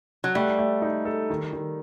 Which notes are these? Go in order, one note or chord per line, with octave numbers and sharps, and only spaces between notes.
F#3
G3 A3
A3
D#4
A4
D#3
D#3